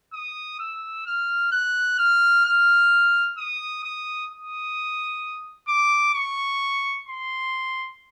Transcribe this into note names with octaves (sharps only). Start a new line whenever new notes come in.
D#6
E6
F6
F#6
F6
F6
D#6
D#6
D#6
D6
C#6
C6